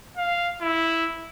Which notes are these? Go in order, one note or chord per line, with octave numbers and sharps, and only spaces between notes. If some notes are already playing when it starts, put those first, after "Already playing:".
F5
E4